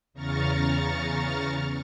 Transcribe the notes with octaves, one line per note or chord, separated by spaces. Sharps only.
E2 C#3 A#5 C#6 F6 A6